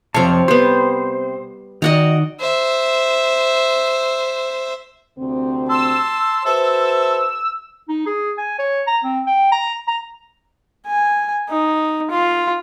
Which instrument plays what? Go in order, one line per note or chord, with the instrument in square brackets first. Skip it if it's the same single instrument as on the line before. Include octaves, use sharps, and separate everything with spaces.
[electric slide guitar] F2 F3 A5 [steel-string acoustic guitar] C3 C4 [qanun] C#5 F5
[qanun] G3 B3 [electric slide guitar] C5
[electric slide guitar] D#3 [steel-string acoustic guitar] F#4 D5 [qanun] D#5 F#5 A#5
[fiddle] C5 E5
[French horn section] D2 C3 C4
[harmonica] A5 C6 [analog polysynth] E6
[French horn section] F#4 B4 C5 [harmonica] A4 E5
[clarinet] D#4
G#4
G#5
C#5
A#5
C4
G5
A#5
A#5
[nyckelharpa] G#5
D#4
F4